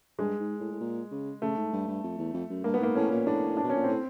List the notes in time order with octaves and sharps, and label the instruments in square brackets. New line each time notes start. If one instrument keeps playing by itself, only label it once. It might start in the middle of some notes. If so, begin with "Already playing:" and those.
[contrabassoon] G2 [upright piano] G#3
[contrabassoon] G#2
A2
A2
A#2
C#3
[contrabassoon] C#3 [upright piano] A3
[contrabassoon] G#2
G2
G2
F2
E2
F2
F#2
[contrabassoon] G2 [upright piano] A#3
[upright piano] B3
[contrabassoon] G#2 [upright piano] A#3
[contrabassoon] A2 [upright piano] C#4
[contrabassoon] A#2
[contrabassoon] A2 [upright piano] D4
[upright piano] D4
[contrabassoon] B2
[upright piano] C#4
[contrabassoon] A#2
[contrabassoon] A2 [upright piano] C4